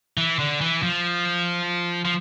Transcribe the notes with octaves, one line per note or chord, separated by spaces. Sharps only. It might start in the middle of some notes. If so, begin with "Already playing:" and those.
E3
D3
E3
F3
F3